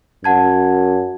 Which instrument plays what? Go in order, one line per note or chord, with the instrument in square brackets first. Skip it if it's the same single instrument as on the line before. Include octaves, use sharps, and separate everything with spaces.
[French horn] F#2 [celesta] F#5 A5 G#6